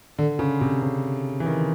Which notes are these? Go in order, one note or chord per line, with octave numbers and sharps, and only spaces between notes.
D3
C#3
C3
C#3
E3
D#3